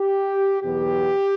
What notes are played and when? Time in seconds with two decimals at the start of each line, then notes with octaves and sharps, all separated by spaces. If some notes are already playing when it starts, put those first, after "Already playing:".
Already playing: G4
0.62 E2 B2 F#3 B3 G4